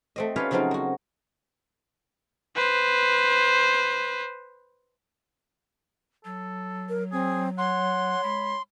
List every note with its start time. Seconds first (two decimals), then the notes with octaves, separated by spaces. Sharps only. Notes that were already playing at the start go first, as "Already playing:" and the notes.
0.16 A3 C4 D#5
0.36 C#4 F4 G4 B4 C#5 F5
0.51 C#3 F3 F#3 C4 D#4 F4
0.71 A#3 F#4
2.56 B4 C5
6.25 F#3 A4
6.89 A#4
7.12 C4 G#4
7.58 C#5 F#5 C6
8.24 G#3 B5